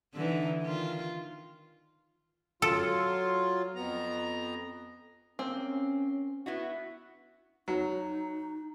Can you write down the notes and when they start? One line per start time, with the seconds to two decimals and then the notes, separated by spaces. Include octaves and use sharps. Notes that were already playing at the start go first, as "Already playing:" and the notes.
0.14 D3 E3 D#4
0.62 D#3 F4
2.62 F#3 F4 A4
3.75 F2 B3 A#5
5.39 A#3 C4 C#4
6.46 B3 E4 F#4
7.68 F#3 D#4